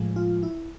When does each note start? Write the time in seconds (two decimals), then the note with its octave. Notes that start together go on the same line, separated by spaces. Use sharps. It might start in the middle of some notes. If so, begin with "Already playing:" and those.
Already playing: A2 F3 G#3
0.16 F4
0.43 E4